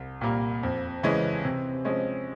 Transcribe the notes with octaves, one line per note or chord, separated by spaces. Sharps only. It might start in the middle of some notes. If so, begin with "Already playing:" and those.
Already playing: C2
A#2 G3 A#3
F2
C#3 E3 G#3 C#4
C3
F3 G#3 C#4